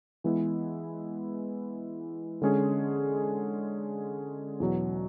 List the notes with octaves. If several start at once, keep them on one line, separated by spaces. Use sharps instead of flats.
E3 G#3 B3 E4 B4
D3 G#3 C#4 G#4
E2 B2 F#3